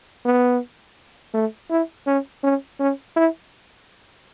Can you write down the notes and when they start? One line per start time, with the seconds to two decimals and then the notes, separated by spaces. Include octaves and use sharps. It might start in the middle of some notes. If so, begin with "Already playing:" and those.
0.25 B3
1.34 A3
1.70 E4
2.07 C#4
2.44 C#4
2.80 C#4
3.16 E4